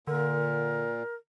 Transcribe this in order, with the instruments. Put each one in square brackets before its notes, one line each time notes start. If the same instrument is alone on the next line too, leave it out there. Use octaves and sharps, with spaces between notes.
[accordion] A#2 [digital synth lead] D3 [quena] A#4